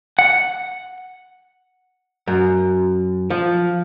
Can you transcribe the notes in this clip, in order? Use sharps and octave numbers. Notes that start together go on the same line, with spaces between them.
F#5
F#2
F3